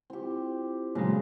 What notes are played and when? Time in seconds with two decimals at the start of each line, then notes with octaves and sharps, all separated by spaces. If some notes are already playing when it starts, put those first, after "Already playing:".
0.10 C4 E4 F4 G4
0.95 A#2 C#3 F#3 G#3